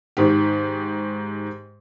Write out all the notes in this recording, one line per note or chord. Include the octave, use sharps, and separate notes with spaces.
G#2 D#3 G4